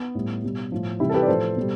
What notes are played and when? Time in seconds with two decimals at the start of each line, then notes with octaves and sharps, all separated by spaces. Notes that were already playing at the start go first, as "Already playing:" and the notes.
Already playing: B3
0.15 A2 G3
0.43 B2 G3
0.72 A2 F3
1.00 C3 E3 G3 E4 G4
1.10 A4
1.14 G4 B4
1.23 D5
1.28 A2 F3 A4 C5
1.56 B2 G3